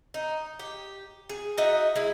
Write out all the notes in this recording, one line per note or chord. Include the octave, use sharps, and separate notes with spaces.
D#4
G4
G#4
D#4 F#4 D#5 E5
G#3 E4